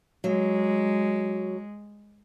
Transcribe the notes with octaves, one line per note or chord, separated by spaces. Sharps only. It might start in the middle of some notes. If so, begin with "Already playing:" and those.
F#3 G#3